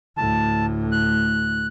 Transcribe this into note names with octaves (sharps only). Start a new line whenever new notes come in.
D2 A2 A5
F#6